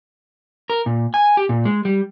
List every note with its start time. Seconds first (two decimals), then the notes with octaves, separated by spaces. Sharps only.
0.70 A#4
0.86 A#2
1.14 G#5
1.37 G4
1.49 A#2
1.65 G#3
1.85 G3